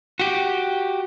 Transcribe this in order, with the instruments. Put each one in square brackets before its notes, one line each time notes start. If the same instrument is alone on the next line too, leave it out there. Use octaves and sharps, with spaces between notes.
[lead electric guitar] F#4 G4